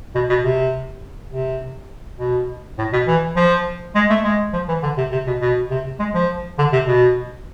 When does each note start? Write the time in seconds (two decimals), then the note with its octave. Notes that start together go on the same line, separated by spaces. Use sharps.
0.15 B2
0.29 B2
0.44 C3
1.32 C3
2.19 B2
2.78 A2
2.93 B2
3.07 E3
3.36 F3
3.95 G#3
4.10 A3
4.24 G#3
4.53 F3
4.68 E3
4.83 D3
4.98 C3
5.12 C3
5.27 B2
5.41 B2
5.71 C3
5.99 G#3
6.14 F3
6.58 D3
6.73 C3
6.87 B2